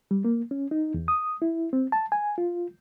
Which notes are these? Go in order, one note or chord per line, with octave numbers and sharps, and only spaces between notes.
G3
A#3
C#4
D#4
E2
D#6
E4
C4
A5
G#5
F4